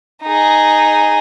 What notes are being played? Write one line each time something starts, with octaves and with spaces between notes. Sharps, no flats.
D#4 G#4